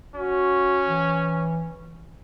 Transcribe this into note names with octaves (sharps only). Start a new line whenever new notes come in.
C#4 F#4
E3